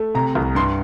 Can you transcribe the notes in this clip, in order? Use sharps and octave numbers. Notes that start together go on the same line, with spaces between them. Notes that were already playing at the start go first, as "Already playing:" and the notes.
Already playing: A3
C3 A#5
C2
G2 C6